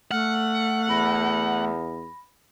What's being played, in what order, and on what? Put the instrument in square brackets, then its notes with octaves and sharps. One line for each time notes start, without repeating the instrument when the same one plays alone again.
[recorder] A3 [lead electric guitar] F#5 [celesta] F6
[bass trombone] E2 [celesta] B5 A#6